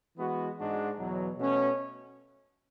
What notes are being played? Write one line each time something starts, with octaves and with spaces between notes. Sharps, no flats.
E3 G#3 B3 F#4
G#2 G#3 D4 F#4
E2 B2 F#3
B2 A3 C#4